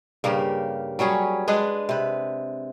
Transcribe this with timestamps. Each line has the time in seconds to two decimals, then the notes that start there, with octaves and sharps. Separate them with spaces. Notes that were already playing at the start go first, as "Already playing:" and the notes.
0.24 G2 C#3 A#3 G4
0.99 F#3 G3 C#4 G#4
1.48 G#3 D4 G#4 B4
1.89 C3 B4